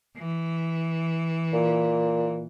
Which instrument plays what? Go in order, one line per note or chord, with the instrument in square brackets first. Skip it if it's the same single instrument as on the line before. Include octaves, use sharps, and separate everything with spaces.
[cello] E3
[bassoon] A#2